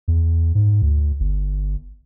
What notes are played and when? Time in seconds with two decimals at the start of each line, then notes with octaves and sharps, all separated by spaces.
0.08 E2
0.55 G#2
0.82 D2
1.20 G1